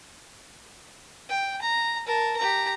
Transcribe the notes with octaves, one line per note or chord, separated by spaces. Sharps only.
G5
A#5
A#4 A5
G4 A#5